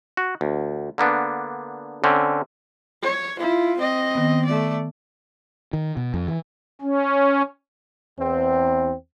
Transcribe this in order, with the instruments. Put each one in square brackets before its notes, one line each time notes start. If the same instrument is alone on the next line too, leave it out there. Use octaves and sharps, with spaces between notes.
[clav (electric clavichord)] F#4
D2
D3 A#3 B3 D4
D3 C4 C#4
[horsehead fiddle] C#5
E4 F4
C4 D#5
[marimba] D#3 B3
[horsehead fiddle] A3 D5
[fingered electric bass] D#3
B2
F2
E3
[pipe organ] C#4
[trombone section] E2 C4